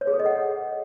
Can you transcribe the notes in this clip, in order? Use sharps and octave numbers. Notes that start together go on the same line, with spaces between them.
C#5
G#4
A4
D#5
F#5